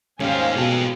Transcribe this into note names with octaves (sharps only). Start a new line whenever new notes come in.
D#2 G#2 A3 C#4 G4 C5 F5 G#5
B2 F4 G#4 A4